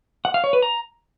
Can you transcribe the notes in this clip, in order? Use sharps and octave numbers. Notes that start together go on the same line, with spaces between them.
F#5
F5
C#5
B4
A#5